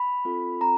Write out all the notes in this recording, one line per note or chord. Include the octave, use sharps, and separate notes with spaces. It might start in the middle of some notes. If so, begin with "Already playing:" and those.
Already playing: B5
C4 F4 A4
C4 F4 A4 A#5